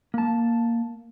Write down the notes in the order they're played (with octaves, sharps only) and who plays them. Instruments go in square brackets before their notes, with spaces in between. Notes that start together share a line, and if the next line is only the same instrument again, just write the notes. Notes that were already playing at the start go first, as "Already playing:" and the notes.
[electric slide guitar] A#3 A5